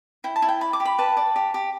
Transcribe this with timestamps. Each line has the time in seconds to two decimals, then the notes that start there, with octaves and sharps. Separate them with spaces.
0.24 E4 G5
0.36 A5
0.42 E4
0.48 G5
0.61 D5 B5
0.73 D6
0.80 G4
0.85 B5
0.98 B4 A5
1.17 D5
1.36 G4
1.54 G4